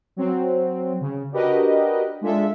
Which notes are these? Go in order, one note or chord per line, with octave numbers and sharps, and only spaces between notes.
F#3 C4
C#3
D4 F#4 G4 A#4 B4 D#5
G#3 D4 F4 A4 E5